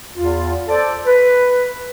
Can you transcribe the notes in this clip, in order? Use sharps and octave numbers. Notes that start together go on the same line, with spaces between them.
E2 F4
A4 C5 D5
B4